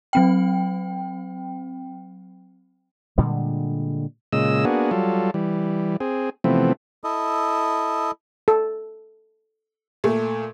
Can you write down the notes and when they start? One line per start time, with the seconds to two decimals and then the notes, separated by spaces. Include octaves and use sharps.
0.13 F#3 C4 G5
3.18 A#2 D3 G3 G#3
4.33 A#2 C#3 G#3 D#5 E6
4.65 A#3 B3 D4 F#4 G#4
4.91 F#3 G3 F4 A4
5.34 E3 G3
6.00 C4 G#4
6.44 C3 E3 F3 A3 B3 C4
7.04 E4 A4 D#5
8.48 A4
10.04 A#2 A3